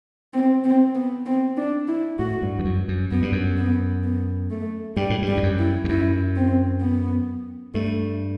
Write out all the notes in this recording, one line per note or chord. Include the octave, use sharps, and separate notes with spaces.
C4
C4
B3
C4
D4
E4
A2 F#4
G2
E2
F#2
F#2
F#2 B3
G2
F#2
B3
B3
A3
G2 G3
A2
G2
G3
E2
F#2
E4
E2
F#2 E4
C4
B3
G2 A3